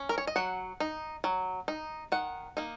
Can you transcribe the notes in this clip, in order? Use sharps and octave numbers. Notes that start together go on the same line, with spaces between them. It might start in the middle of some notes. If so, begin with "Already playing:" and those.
Already playing: C#4
A#4
C#5
D#5
F#3 F#5
D#4
F#3
D#4
D#3 F#5
A#3 D#4